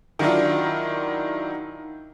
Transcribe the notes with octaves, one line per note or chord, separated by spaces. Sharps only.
D#3 F#3 D4 E4 F4